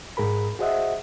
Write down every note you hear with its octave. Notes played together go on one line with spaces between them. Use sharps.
G#2 G#4 A#4 B5
F#4 G#4 C5 D#5 E5 F#5